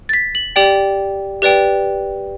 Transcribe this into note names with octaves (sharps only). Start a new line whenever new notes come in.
A6
B6
F#7
G4 D5 G5 F#7
G4 B4 D5 G5